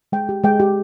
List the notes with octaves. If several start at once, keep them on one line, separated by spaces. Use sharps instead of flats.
G#3 G5
G4
G#3 G5
G4